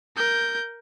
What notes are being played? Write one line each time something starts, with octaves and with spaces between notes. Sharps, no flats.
A#4 G6